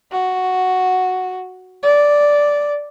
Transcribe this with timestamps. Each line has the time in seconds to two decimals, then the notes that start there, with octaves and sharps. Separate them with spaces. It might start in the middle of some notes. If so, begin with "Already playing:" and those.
0.12 F#4
1.83 D5